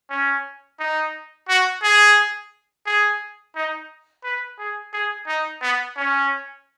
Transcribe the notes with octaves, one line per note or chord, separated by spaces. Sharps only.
C#4
D#4
F#4
G#4
G#4
D#4
B4
G#4
G#4
D#4
B3
C#4